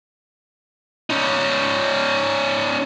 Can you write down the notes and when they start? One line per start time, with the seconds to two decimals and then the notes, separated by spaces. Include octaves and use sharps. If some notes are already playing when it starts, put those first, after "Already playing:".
1.10 C#4 D#4